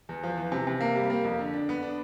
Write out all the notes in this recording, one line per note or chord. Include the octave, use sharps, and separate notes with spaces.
E2
F3
E3
C3
C3
A#3
G3
A#3
F2
D3
D4
B3
D4